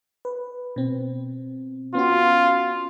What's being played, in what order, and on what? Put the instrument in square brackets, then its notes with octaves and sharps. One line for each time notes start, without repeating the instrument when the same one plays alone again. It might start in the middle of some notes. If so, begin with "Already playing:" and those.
[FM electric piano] B4
B2 C4
[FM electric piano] B3 C#4 F#4 [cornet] F4